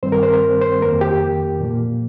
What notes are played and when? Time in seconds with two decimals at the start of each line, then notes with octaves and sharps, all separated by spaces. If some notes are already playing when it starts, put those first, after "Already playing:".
0.03 G2 D#3 G3 C4 C5
0.12 A#4
0.23 C5
0.33 A#4
0.62 C5
0.81 F2 D#3 A#3 A#4
1.01 G4
1.61 A#2 F3 A#3